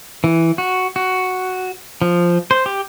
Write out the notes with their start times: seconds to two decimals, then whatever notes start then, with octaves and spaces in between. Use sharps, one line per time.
0.24 E3
0.58 F#4
0.96 F#4
2.02 F3
2.51 C5
2.66 G4